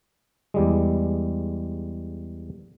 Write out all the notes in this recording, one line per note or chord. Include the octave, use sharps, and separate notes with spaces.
E2 G3 G#3